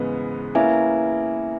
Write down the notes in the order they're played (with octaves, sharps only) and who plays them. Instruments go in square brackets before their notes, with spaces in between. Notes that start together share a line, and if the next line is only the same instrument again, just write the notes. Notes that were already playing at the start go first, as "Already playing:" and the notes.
Already playing: [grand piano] G#2 C#3 E3 G#3 B3
[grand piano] A#3 C#4 [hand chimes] E4 B4 E5 G#5